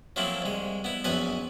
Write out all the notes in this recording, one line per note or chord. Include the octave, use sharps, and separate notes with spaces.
F3 F#3 A3 A#3 C4 E4
C2 G#3
B3 E4
A#1 F#2 B3 B4 G#5